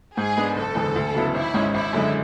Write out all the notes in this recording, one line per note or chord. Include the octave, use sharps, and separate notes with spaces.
G#2 G#4
G#3 B3 D4
F#1 A4
E2 D3 G#3 B3
D2
C#3 F#3 B3 E4
G#1 E4
G#2 G#3 C#4
G#1 E4
F#2 D3 G#3